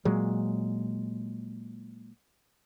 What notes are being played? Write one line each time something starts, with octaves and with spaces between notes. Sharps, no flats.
A#2 F#3 G#3